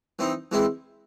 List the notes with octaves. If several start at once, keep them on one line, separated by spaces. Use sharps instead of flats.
E3 C4 D#4
E3 G#3 C4 E4